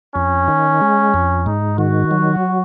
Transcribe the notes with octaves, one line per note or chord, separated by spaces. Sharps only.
F2 C#4
D#3
G#3
F2
G#2 D#4
D#3 F#4
F#3